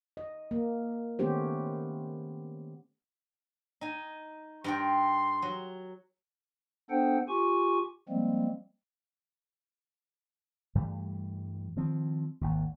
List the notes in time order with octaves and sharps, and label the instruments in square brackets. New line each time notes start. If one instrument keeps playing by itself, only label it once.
[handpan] D#5
A#3
D#3 A3 B3 C#4 G4 C5
[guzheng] D#4 G#5
[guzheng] G2 A#4 G5 [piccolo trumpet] C6
[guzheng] F#3
[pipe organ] B3 D4 A4 C5 F#5 G5
F4 G4 G#5 C#6
F3 G3 G#3 A#3 C4
[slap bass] G2 E3 G3 A3
D#3 F3 C4
G#1 D#2